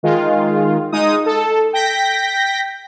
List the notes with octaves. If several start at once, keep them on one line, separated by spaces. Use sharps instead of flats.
D#3 G#3 F4
G#3 D#4 D#6
A4
G5 G6 A#6 B6